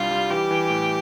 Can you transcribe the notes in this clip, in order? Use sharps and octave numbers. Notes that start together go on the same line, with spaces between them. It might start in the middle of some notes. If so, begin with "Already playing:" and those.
Already playing: C2 G3 D4 F4
G3
E3 G4
E3
A2